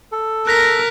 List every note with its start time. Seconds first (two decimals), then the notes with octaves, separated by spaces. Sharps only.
0.12 A4
0.47 A#4 F#6 A#6 B6